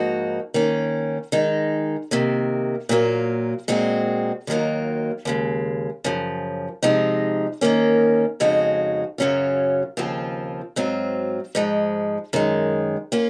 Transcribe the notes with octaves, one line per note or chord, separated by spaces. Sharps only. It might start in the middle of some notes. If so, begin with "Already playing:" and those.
Already playing: G#2 F3 A#3 D#4 F#4
D#3 A#3 C#4
D#3 G#3 D#4
C3 D#3 A#3
A#2 F#3 A#3 F4
A#2 G#3 C4 F#4
D#2 D#3 F#3 A#3 F4
D#2 C#3 G#3
F#2 C#3 F3
C3 F3 G#3 D#4
D#3 A#3 C#4
F2 C#3 G#3 D#4 F#4
F#2 C#3 F#3 C#4 F4
D#2 C#3 F3 C4 F4
G#2 F#3 C4 F4
G#2 F3 G#3
F#2 D#3 G#3
A#3 C#4 F4